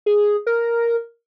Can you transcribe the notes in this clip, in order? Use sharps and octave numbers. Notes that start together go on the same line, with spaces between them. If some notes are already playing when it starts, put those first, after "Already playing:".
G#4
A#4